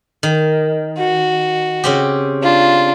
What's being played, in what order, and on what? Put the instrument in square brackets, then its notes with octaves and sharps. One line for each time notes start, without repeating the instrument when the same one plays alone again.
[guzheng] D#3
[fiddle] F#4
[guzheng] C#3 C4 G4
[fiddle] D4 F4